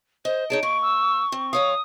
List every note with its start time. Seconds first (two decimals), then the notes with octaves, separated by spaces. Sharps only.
0.25 C5 D#5
0.50 D#4 G#4 C#5 A5 D7
0.63 A#3 C#6
0.82 E6
1.32 C4
1.53 D#2 C#5 F5 D#6